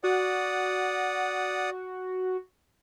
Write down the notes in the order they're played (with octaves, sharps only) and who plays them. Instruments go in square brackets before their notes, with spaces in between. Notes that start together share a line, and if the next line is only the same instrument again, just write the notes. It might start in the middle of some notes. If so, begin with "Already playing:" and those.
[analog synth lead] F#4 [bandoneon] D5 F#5 D#6